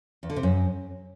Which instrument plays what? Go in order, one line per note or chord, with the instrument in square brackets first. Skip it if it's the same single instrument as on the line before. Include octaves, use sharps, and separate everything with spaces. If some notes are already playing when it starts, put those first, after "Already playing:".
[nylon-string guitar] E2
D3
C3
F#2